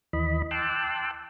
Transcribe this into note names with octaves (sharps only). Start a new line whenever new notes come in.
D#2 E3 D#5 B5
G5 A5 C6 D6 E6 F#6